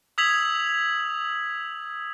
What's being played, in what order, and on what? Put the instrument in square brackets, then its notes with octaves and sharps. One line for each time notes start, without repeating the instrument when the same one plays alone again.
[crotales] D#6 E6 G#6 B6 F7 F#7